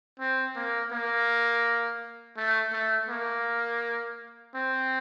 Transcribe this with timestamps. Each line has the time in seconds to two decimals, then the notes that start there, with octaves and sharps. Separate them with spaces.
0.20 C4
0.55 A#3
0.92 A#3
2.37 A3
2.73 A3
3.09 A#3
4.54 C4